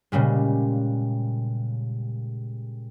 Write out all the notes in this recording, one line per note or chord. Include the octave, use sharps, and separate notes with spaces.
A#2 C#3 G3 G#3